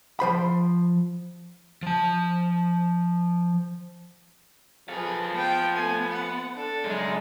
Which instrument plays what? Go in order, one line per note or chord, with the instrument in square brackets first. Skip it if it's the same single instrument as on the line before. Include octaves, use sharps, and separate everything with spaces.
[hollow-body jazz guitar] F3 C5 B5
[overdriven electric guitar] F3 A5
[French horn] F3 [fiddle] G#4 B4 [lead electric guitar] A4 F5
[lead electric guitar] B3 [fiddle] G5
[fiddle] A3 G#5
F#5
D4 A4
[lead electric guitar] C#2 F#2 [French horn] G#3